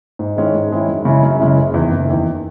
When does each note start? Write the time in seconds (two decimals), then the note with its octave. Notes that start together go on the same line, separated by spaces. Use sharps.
0.19 G#2
0.37 D#3 G#3 C#4 E4
0.54 G#2
0.71 D#3 G#3 C#4 E4
0.88 F#2
1.05 C#3 G#3 C#4 E4
1.23 F#2
1.40 C#3 G#3 C#4 E4
1.57 F#1
1.74 E2 D#3
1.91 F#1
2.08 E2 D#3